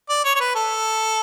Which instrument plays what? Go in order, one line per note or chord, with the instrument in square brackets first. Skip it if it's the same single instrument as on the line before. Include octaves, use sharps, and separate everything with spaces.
[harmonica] D5
C#5
C#5
B4
A4